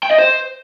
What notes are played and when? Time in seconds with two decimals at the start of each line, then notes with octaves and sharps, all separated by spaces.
0.03 G5
0.11 D#5
0.19 C5